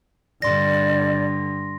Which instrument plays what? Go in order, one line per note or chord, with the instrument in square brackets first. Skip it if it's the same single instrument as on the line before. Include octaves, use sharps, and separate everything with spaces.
[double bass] G2 D3 [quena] D5 [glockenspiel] C6 A#6